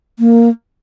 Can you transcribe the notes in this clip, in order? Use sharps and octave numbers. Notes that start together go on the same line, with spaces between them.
A#3